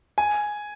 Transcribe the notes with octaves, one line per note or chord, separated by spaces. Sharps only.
G#5